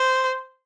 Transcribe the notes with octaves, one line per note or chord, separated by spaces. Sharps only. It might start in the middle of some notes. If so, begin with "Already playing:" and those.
Already playing: C5